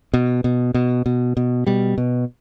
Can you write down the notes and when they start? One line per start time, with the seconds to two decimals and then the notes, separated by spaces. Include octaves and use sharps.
0.14 B2
0.44 B2
0.74 B2
1.06 B2
1.37 B2
1.67 B2 G3
1.98 B2